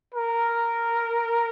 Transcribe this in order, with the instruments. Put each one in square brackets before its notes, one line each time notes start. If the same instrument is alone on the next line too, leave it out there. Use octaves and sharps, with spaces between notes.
[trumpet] A#4